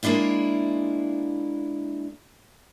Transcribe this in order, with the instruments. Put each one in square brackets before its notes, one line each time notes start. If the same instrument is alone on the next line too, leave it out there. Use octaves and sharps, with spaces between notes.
[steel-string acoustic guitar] G#3 A#3 D4 E4 F4